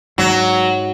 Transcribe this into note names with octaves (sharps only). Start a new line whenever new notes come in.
G#2 F#3